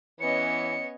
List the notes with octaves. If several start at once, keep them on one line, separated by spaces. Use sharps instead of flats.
E3 B3 C#4 C#5 D#5 C#7